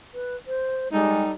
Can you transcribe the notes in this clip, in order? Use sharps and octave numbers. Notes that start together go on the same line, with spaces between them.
B4
C5
G3 G#3 D#4 A4